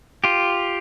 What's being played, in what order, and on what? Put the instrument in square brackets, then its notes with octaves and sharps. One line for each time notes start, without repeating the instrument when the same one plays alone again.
[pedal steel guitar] F4 G4